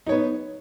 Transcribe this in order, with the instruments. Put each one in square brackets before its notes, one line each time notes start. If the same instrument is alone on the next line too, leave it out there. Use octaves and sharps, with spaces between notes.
[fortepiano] D#4
C#5
B3